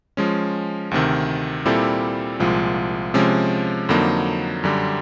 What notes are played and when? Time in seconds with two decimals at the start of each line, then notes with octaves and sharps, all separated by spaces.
0.17 F3 G#3 C#4
0.91 D2 C3 D#3
1.66 A#2 G3 C4 E4 A4
2.40 C2 A#2 F3 G#3
3.14 C3 F3 G#3 C#4
3.89 F2 D3 F#3 A#3 D#4
4.64 F#2 D3 G3